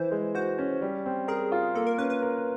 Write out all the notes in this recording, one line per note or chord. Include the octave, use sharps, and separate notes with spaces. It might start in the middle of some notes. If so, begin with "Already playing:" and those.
Already playing: E3 C5
G#3
F#4 C5
C#4
G3
C4
G#4 A#4
F4
A#3 A4
A#4
C#4 B4
B4
A#4